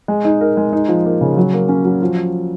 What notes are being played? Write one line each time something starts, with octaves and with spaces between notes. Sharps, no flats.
G#3
D#4
A#4
G#3
D#4
F3
A#3
C#3
F#3
A#3
C#4
F#3
F3